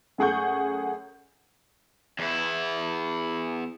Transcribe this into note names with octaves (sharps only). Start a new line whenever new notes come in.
F#2 A3 G#4 F#5 C#6 G6
E2 E4